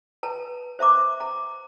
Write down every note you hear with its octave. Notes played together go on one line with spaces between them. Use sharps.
B4 A5 A#5
C5 E5 A#5 D6
A#5